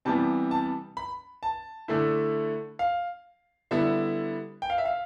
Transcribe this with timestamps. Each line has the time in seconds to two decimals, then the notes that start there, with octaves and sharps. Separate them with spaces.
0.05 C3 E3 G3 B3 A5
0.51 A5
0.97 B5
1.43 A5
1.88 D3 A3 E4
2.79 F5
3.71 D3 G3 B3 E4 E5
4.62 G5
4.70 F5
4.78 E5
4.85 F5